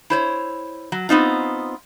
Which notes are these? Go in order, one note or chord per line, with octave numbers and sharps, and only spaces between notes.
E4 C5 C#5
F#3
B3 C4 D#4 F4